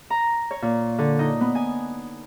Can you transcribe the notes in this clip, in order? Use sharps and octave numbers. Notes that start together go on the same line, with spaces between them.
A#5
C#5
A#2
D3
D#4
B3
G#5